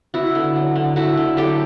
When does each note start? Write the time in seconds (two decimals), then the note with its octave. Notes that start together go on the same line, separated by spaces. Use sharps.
0.14 B3 E4 F#4
0.35 D3
0.56 F#3
0.76 D3
0.96 A3 E4 F#4
1.17 D3
1.37 F#3 G4 A4